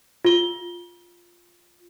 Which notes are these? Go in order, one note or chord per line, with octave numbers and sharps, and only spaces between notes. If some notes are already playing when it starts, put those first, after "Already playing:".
F4 G7